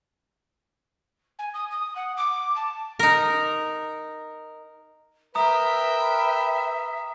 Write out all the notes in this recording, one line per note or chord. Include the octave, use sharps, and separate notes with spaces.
G#5
D#6
D#6
F#5
D6
A5
D#4 A#4
A#4 B4 E5 G5 A#5 D#6